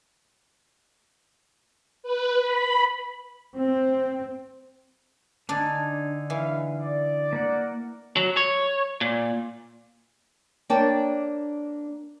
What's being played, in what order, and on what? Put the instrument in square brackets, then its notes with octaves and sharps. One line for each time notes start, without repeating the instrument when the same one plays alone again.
[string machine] B4
B5
[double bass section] C4
[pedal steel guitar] D3 D#4 G#5 [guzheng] D4
[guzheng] E3 [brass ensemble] G#3 B4 F5
[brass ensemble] D5
[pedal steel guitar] A#3 A#4 F#5
[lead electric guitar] F#3
C#5
A#2
[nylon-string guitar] A#3 D4 C#5 G5 A5